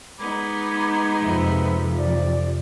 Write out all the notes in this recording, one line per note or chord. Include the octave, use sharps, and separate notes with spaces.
G#3 B3 D#4 B5 D6 G#6
F2 C3 F3 B4 E5 B5
D5